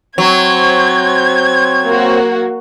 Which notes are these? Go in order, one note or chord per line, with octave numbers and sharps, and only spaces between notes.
F#3 C4 C5 C#5 G#6
A#3 F#4